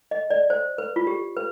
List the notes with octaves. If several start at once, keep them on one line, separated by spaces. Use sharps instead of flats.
D#5
D5
C5
B4
F4
G4
B4